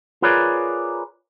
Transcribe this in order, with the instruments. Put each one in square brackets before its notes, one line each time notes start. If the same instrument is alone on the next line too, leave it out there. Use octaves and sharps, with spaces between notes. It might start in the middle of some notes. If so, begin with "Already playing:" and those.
[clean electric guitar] F4 G#4 A#4 B4 C#5 D5